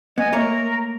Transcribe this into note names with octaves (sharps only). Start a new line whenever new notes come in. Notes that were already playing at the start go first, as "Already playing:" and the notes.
B3 D#5 G#5 G#6
A3 A#3 A#4 C#5 A#5